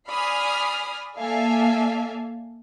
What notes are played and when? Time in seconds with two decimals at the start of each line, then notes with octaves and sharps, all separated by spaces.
0.10 D5 G#5 B5 D#6 F6 C7
1.19 A#3 A4 D5 E5 F5 G#5